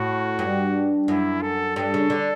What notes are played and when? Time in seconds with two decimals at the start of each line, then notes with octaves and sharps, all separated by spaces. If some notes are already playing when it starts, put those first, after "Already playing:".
Already playing: A2 F#4
0.39 G2
1.08 F#2 E4
1.42 A4
1.76 G2 A4
1.94 C#3
2.10 D3